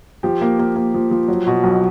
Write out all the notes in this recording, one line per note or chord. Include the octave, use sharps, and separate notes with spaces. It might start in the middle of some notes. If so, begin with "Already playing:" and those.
F3 G4
A#3
A#3
A#3
F3
F3
F#3
B2
B1